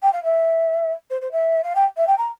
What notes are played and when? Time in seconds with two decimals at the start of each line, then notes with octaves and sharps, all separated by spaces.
0.03 G5
0.13 F5
0.24 E5
1.10 C5
1.22 C5
1.32 E5
1.64 F5
1.76 G5
1.97 E5
2.07 G5
2.18 A#5